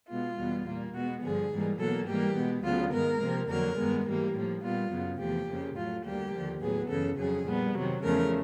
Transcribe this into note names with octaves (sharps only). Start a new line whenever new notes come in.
B2 G#3 B3 F4
E2 B2 G3 B3
A#2 G3 A#3
B2 G#3 B3 F#4
G2 D3 F3 G#4
G#2 E3 G3 A#3
B2 F#3 A#3 A4
G#2 E3 G3 A#3 G4
B2 G#3 B3
D2 C#3 F#3 B3 F4
G#2 D#3 G#3 B3 A#4
C3 F3 A#3
F2 D3 F#3 A#3 A#4
G2 D#3 G#3 B3
G#2 E3 G3 A#3
A2 F3 A#3
A#2 G3 B3 F4
F#2 C#3 F#3 B3
E2 C3 F3 A3 G4
F2 C#3 F3 A#3
A2 F#3 A3 F4
D2 D3 G3 A#3 G4
D#2 D3 F3
A2 F#3 B3 G#4
F#2 C#3 E3 A4
F2 C#3 F#3 G#4
A#2 G3 B3
C3 D#3 F#3
E2 C#3 F3 A3 A#4